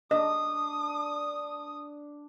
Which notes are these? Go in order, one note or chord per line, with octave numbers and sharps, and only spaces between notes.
D4 D#5 D#6